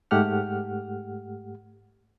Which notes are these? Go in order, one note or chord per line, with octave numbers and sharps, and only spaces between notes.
G#2 A3 G4 F#5 F6